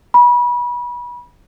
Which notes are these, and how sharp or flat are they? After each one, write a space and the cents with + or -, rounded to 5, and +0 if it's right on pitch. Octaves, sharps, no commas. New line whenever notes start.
B5 -30